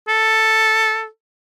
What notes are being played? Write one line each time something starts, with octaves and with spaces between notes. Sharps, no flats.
A4